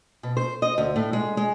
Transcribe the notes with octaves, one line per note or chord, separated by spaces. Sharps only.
B2
C5
D#5
D2
A2
G#3
G#3